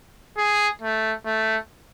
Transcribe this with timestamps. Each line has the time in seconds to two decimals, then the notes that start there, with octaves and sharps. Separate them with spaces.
0.37 G#4
0.82 A3
1.26 A3